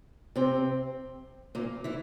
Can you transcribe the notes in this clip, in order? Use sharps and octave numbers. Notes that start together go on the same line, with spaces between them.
C3 C4
A#2 A#3
E3 E4